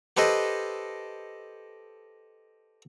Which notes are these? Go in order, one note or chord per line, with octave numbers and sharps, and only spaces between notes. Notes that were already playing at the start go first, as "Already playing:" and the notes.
G4 A4 B4 C5 D#5